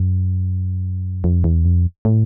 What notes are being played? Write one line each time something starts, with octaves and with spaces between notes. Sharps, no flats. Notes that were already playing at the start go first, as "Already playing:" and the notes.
Already playing: F#2
F2
E2
F2
A2